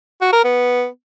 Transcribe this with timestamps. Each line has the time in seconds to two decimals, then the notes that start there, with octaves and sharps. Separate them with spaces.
0.21 F#4
0.33 A#4
0.44 B3